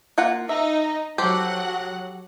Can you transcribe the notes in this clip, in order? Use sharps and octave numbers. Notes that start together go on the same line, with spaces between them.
A#3 F4 F#5
D#4 E5
F#3 G4 A4 C5 F#5